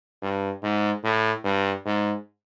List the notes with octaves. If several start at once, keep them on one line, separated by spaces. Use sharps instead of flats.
G2
G#2
A2
G2
G#2